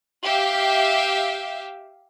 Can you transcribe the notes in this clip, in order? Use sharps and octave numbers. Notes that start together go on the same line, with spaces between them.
G4 E5 F5